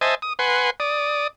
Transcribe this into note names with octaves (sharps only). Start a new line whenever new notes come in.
C5 D#5 E5 G#5 A5
D#6
B4 F#5 G#5 C6
D5 D#6